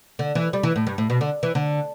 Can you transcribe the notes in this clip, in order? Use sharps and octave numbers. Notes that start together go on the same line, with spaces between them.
D3
E3
G3
E3
A2
G2
A2
B2
D3
E3
D3